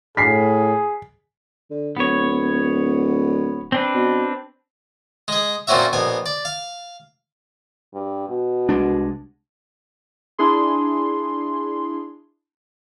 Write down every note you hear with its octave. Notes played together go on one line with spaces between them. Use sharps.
A2 G#4 B6 C7
D3
D1 B3 C#5
C4 D4 B4
B2
G#3 G#4
F#2 A#2 C4 C#4 F#4 E5
A#1 B2 G#5
D5
F5
G2
B2
C2 G#3 D4
D4 E4 G#4 C6